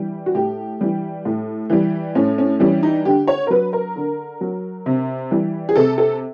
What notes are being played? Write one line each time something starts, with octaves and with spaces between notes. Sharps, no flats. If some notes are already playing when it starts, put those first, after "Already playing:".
Already playing: E3 G3
F#4
A2 G4
E3 G3
A2
E3 G3
A2 C#4
C#4
E3 G3 C#4
D#4
D3 G4
C#5
A#4
F#3 B4
A#4
D3
F#3
C3
E3 G3
G#4
C3 A4
A4